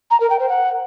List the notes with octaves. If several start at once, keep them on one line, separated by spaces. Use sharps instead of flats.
A#5
A#4
G5
C5
F#5